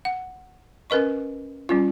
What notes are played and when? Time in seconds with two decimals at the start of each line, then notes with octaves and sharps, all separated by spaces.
0.05 F#5
0.90 C#4 A#4 B4 D#5 C#6
1.69 G3 C#4 F4